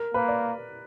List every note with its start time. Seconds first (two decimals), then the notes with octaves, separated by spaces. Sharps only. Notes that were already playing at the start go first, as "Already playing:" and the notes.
Already playing: A#4
0.14 A#3 B4
0.28 D5